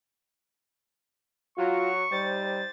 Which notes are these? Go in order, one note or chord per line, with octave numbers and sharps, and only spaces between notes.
F#3 F4 F#4 C#6
G3 D#4 G4 C5 A6